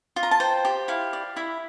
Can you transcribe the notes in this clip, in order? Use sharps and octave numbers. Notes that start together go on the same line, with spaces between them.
F4
A#5
A5
C5 G5
G4
E4 F5
D5
E4 E5